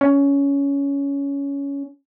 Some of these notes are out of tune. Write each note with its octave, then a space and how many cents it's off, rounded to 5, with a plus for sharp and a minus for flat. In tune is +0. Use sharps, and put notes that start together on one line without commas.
C#4 +15